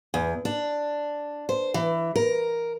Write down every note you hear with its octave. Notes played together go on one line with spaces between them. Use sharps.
E2
D4
C5
E3
A#4